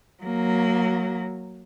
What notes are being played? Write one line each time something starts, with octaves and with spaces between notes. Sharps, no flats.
F#3 A#3